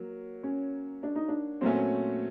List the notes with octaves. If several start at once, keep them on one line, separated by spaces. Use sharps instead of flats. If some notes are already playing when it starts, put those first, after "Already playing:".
Already playing: F#3 A#3
C#4
D4
D#4
D4
A#2 F#3 A3 C4 C#4